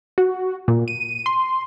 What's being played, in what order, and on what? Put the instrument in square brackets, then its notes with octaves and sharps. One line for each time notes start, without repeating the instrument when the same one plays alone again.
[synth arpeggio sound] F#4
A#2
D#7
C6